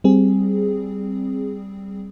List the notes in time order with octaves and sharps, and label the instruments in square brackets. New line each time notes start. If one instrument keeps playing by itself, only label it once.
[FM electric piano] G3 C4 G#4